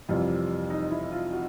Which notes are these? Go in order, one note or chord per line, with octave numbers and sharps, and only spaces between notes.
F2 C3 E3 G3 F4
D#4
E4
F4
F#4